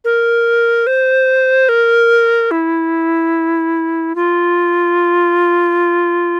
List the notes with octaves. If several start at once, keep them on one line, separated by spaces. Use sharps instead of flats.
A#4
C5
A#4
E4
F4